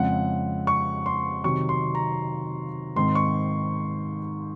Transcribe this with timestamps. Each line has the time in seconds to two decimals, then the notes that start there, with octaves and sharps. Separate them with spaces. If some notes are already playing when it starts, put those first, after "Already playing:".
Already playing: F2 C#3 G#3 C4 F#5
0.67 C#6
1.06 C6
1.44 C3 D#3 F#3 C4 C#6
1.69 C6
1.95 A#5
2.96 G#2 D#3 G#3 C4 C6
3.15 C#6